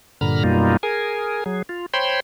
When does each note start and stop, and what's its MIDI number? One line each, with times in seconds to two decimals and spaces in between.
0.21 0.43 43
0.21 0.43 46
0.21 0.43 50
0.21 0.43 82
0.21 0.43 83
0.21 0.43 89
0.44 0.77 42
0.44 0.77 47
0.44 0.77 55
0.44 0.77 58
0.44 0.77 63
0.44 0.77 65
0.83 1.44 68
0.83 1.44 70
0.83 1.44 80
1.46 1.62 54
1.46 1.62 68
1.69 1.86 65
1.94 2.20 72
1.94 2.20 73
1.94 2.20 79
1.94 2.20 83
1.94 2.20 84